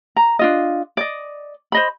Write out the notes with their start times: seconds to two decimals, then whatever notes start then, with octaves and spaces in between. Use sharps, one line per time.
0.16 A#5
0.39 D4 F4 D#5
0.97 D5 D#5
1.72 C5 D#5 B5